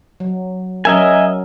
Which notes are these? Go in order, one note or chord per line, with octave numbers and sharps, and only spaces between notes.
F#3
F#3 C#4 A#4 D#5 E5 G#5